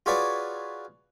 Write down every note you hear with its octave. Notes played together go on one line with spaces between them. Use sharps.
F4 F#4 G#4 B4 C#5 D5